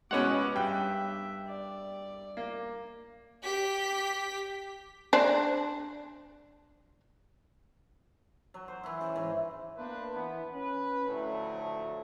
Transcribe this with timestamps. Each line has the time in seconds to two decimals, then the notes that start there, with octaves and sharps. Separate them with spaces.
0.11 B2 G#3 B3 C#4 C#5 F#5 D6
0.56 G2 E5 G5
1.47 D5
2.37 A#3
3.43 G4 B6
5.13 D4 C5
8.54 F#3
8.68 C5
8.83 E3 E4
9.01 C#3 E3
9.16 G#2 E3
9.76 A#3 B3 D4 B4 C5
10.13 E3 B3
10.53 C#4 B4
11.07 D2 A2 F3 F#3 A3